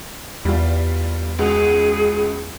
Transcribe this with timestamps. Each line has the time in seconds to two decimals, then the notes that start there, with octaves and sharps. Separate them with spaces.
0.45 E2 G3 F4
1.39 C#2 F#4 G#4 F7